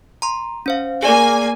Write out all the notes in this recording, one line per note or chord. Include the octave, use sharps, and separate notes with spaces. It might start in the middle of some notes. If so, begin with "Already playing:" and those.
A#5 C6
C#4 C5 F5
A#3 G#4 D5 G#5